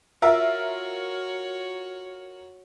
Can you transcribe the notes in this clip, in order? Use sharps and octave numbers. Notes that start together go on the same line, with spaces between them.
F4 F#4 A#4 C#5 E5